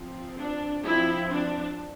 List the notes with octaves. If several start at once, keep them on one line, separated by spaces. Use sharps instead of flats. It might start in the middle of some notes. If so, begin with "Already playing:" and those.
Already playing: F3 C4
D4
F3 C4 E4
D4